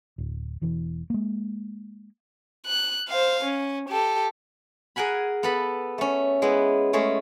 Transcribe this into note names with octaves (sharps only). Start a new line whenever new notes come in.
D1
E1 E2 E3
G#3 A#3
F#6
C5 F5
C#4
G4 A4
G#4 A#4 F#5 G#5 B5
B3 A4 B5
A3 C#4
G#3 B3 E4
G#3 A3 C#4 G#4